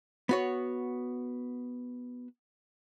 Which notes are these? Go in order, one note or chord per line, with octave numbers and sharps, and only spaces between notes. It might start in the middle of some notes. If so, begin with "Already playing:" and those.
B3 F#4 C#5